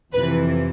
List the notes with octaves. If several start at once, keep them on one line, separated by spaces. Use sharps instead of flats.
F2 C3 E3 B4